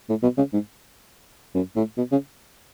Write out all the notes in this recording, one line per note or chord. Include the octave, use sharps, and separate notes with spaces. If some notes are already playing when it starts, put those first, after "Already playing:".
A2
B2
C#3
G#2
F#2
A2
B2
C#3